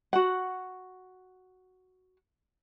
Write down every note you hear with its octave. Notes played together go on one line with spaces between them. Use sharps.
F#4 F#5